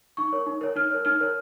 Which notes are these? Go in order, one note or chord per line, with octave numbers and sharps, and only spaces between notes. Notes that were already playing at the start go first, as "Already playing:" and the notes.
D#4 C#6
A#4 C#5
D#4
A#4 C#5
D#4 F6
A#4 C#5
D#4 F6
A#4 C#5